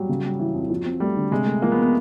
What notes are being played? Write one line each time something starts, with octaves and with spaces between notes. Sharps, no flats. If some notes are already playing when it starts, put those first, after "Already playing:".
Already playing: F#3 G3
C#3
G3
E3
F2
F3
C4
G3 A3
D3
C3 G#3
A3
F3 A#3
B3
B3